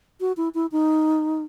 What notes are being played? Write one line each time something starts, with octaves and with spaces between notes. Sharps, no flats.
F#4
E4
E4
D#4